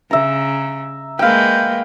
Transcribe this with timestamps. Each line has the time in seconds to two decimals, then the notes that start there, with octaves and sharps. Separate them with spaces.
0.11 C#3 E5 A#5
1.19 G#3 A#3 B4 F5 G5